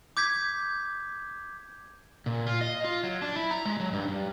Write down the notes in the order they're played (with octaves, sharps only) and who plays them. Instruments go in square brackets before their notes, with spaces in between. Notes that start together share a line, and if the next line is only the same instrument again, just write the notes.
[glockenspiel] D6 G6 G#6 B6
[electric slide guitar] A#2
F4
D#5
F4
F#3
D4
E4
A#5
G#3
F#3
G2
G2